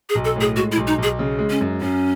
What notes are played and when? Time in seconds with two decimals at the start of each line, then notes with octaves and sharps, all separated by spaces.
0.09 G#4
0.15 B1
0.25 A4
0.36 A2 G#4
0.56 G#3 F#4
0.72 E4
0.77 B1
0.87 D#4
0.98 B1 G#4
1.19 C#3
1.39 G#3
1.50 C#4
1.61 F#2
1.81 F#2 C#4